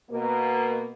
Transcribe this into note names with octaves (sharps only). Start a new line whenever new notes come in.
B2 A#3